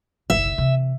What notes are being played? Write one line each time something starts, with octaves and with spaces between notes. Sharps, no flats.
F#1 B1 E5
C3 E3